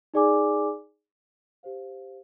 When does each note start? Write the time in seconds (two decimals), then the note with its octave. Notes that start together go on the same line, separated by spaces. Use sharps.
0.14 D#4 G#4 D5 G#5 D6
1.63 G4 C5 F5